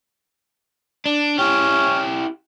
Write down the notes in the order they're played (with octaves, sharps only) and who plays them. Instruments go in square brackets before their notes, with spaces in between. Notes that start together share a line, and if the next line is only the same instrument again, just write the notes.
[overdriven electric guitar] D4
[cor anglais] C#4 [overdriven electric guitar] E4 G4